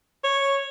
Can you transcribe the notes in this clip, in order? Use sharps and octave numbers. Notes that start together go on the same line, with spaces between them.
C#5